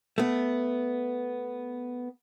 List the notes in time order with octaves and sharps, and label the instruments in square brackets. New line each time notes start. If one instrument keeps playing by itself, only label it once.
[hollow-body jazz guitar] A3 B3